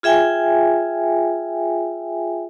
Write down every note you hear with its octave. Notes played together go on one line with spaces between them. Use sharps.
F4 G#4 E5 G5 G#5